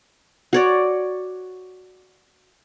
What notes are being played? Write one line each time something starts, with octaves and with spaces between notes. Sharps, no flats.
F#4 C#5 D5